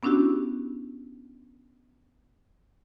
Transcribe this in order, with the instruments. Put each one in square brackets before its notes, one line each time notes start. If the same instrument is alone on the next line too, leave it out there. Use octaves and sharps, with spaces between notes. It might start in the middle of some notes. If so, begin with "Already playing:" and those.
[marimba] B3 C#4 D4 E4 F#4 G4